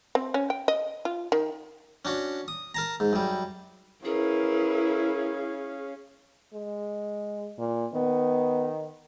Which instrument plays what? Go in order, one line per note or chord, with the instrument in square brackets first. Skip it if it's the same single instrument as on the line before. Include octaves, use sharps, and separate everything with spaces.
[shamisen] C4
C#4
G5
D#5
F4
D#3
[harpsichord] C#4 D4 F#4
D#6
A#4 A5 A#5
G#2
F#2 G3
[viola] C#4 F5 [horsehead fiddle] E4 [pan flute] G#4 [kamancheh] A#4 B4
[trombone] G#3
[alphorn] A#2
[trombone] D#3 [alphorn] B3